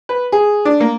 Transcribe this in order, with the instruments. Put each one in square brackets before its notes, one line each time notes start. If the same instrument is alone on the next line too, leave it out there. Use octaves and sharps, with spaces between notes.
[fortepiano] B4
G#4
D4
A#3